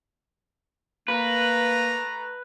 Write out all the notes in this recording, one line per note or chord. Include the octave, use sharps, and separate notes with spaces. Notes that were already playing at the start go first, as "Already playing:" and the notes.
A3 A#3 B4 A#5